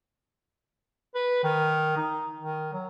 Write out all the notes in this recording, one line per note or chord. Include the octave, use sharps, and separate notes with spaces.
B4
D#3
D#4
D#3
F#3